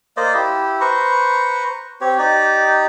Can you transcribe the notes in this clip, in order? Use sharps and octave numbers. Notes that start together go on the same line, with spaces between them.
A#3 C5 D5 D#5
E4 G4
B4 C5 A#5 C#6
C4 G4 C#5
D#4 G4 D5